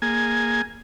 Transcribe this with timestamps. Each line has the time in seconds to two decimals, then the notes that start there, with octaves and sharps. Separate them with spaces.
0.02 A#3 G#4 G#5